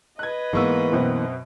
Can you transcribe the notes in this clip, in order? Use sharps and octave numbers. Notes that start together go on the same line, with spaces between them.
B4 D#5 F#6 G#6
G#2 E3 A#3 B3 C#6 E6
F#2 B2 C4